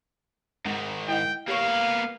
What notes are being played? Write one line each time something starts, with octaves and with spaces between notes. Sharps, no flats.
G#2 D#3 G#3
E4 D#5 F#5 G5
A#3 B3 G4 C#5 F5 C#6